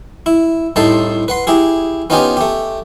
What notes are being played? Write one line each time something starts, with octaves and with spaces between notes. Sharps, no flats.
E4
C2 A2 D#4 A4 A5 C6
B4 F#5 C6
E4 G4 G#4
B3 C#4 D#4 F4 G4 G#5
A3 G4